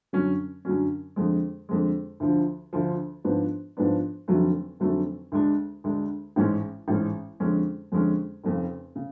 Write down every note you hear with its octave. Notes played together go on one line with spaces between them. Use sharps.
F#2 D3 F#3 C#4
F#2 D3 F#3 C#4
F2 D3 G#3
F2 D3 G#3
D2 D3 F3
D2 D3 F3
G#2 F3 B3 D4
G#2 F3 B3 D4
F1 F2 D3 F#3 A3
F1 F2 D3 F#3 A3
D2 D3 G#3 D4
D2 D3 G#3 D4
A1 G#2 G#3 C#4
A1 G#2 G#3 C#4
F2 D3 G#3 C#4
F2 D3 G#3 C#4
F1 F2 C#3
C#3